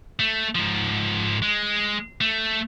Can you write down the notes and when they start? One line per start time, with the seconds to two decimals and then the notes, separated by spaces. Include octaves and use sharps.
0.19 A3
0.55 G#2 F3
1.42 G#3
2.21 A3